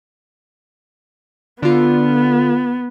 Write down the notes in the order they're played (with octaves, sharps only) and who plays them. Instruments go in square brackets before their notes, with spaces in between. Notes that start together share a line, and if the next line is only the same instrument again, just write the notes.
[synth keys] D3 F4 [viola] B3